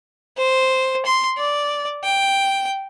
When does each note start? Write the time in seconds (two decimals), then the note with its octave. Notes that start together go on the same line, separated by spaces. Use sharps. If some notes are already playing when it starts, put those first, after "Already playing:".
0.37 C5
1.06 C6
1.37 D5
2.04 G5